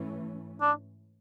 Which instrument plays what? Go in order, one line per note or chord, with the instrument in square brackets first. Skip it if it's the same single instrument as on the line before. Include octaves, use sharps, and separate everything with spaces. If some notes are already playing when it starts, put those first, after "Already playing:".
Already playing: [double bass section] G#2 E3 A3 C#4
[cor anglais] D4